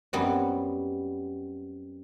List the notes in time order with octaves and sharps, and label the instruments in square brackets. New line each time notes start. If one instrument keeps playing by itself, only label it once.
[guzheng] F#2 G3 B3 C4 F#4